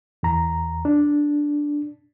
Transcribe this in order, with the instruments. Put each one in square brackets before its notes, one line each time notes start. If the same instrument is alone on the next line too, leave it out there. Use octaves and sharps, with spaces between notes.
[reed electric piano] E2 A#5
D4